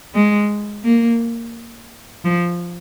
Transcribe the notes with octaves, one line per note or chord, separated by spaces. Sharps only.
G#3
A#3
F3